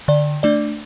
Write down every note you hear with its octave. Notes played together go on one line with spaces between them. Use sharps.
D3 D5
A3 D4 D5